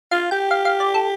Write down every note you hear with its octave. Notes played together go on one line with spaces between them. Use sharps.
F4 F5
G4 G5
F5
F5
D5
A4